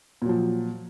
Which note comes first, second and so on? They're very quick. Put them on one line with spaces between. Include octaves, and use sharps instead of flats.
A#2 F#3 F3